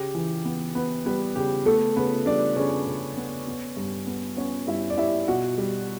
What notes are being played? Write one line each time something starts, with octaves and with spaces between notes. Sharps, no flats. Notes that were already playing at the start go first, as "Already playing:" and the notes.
Already playing: C#3 G4
E3
B3
B3 B4
G3 B3 B4
C#3 G4
A3 B3 A4
C#3 B3 B4
G3 D4 D5
C#3 C#4 C#5
C#3
B3
B3
G2
B3
B3 C#4 C#5
G2 E4 E5
D5
G3 E4 E5
B2 F#4 F#5
G3